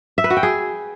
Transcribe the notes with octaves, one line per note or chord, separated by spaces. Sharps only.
E5
B4
F#4
G5
G#4